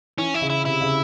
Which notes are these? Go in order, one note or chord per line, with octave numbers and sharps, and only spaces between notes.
E3 C#4
E4
C#3
E4
C3 E4
C#3